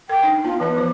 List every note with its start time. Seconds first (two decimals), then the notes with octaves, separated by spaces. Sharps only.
0.09 A#4 G5 D6
0.23 D4 D#4
0.45 B3 F4
0.60 E3 B3 B4 D#5
0.77 F3 C5